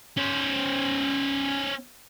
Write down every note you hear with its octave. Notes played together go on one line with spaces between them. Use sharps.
C#4 C5